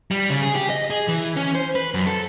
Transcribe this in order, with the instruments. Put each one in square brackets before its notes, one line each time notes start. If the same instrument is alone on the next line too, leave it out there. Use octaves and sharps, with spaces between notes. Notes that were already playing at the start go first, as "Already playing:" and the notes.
[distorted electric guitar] G3
C#3
G#4
G4
D#5
G#4
E3
C#4
C5
B4
F#2
A4